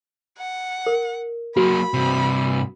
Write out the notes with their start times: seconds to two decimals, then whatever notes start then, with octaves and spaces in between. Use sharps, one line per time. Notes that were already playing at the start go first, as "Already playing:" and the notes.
0.38 F#5
0.86 A#4
1.57 F#3 A#3 F#4 B5
1.94 G2 C3